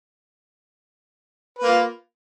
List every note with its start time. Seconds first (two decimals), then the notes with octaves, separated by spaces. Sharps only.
1.59 B4
1.63 A#3
1.67 F4